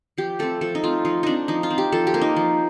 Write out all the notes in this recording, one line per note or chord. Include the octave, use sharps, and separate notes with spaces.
F3 G4
A3 C4 A4
F3 A4
D#4
A3 C4 F4
F3 D#4
C4 D4 D#4
F3 D#4
F4
C4
G4
F3 A4
G4
A#3
D#4
F3